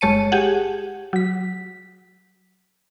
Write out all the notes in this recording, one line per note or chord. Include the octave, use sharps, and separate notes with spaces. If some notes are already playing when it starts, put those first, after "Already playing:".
G1 G#3 C#5 A5 C#7 D#7
G4 G#4 F#5
F#3 B6